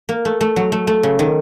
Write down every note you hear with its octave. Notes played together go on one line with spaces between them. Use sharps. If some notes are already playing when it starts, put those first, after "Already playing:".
A#3
A3
A3
F#3
A3
A3
C#3
D#3